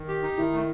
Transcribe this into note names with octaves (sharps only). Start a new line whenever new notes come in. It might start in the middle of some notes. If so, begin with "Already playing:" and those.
Already playing: D#3
G4
D#4
D#3 E4
A3